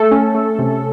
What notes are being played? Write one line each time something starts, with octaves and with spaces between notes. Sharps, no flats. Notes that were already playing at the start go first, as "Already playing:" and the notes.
Already playing: A3 A4
C#4
A3
C3